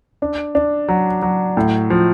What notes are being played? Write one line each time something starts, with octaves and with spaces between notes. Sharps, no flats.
D4
D4
F#3
F#3
A2
F3